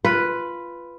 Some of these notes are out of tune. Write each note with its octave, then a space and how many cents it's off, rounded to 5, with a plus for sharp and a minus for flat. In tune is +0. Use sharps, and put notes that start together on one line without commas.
F4 -10 B4 +0